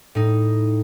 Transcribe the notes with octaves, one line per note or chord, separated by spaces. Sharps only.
A2 D#4